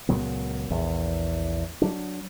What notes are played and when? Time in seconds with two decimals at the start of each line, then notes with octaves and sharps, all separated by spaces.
0.09 C#2 A#2 F#3 B3
0.70 A#1 E2
1.82 F#3 D4